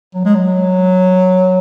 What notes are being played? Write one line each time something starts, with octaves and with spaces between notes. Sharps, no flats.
F#3
G#3
F#3